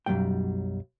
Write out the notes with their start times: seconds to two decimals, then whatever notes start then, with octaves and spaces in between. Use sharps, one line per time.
0.06 B1 F#2 D#3 F#3 G3 G5